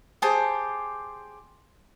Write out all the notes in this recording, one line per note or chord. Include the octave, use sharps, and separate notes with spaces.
G4 G#4 C5 A5